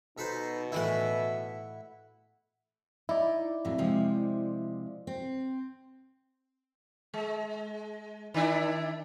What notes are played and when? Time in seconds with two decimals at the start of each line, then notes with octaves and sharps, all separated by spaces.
0.18 B2 D#4 A4 B4 C5
0.72 A2 E3 E4 F#4 E5 F#5
3.09 D#4 E4 D5
3.65 F2 A2 F#3
3.78 C3 F3 G#3
5.07 C4
7.14 G#3
8.34 D#3 D4 E4